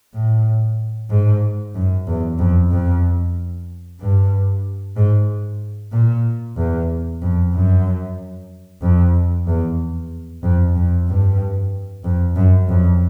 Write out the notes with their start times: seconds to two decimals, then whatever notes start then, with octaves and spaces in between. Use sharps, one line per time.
0.14 A2
1.10 G#2
1.75 F#2
2.07 E2
2.39 F2
2.71 F2
4.00 G2
4.97 G#2
5.92 A#2
6.57 E2
7.22 F2
7.53 F#2
8.82 F2
9.47 E2
10.43 F2
10.75 F2
11.07 G2
12.04 F2
12.36 F#2
12.68 F2